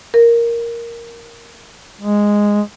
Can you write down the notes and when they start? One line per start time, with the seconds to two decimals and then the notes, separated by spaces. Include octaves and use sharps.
0.14 A#4
2.01 G#3